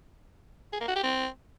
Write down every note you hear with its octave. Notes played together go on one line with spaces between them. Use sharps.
G#4
A#3
F#4
G4
C4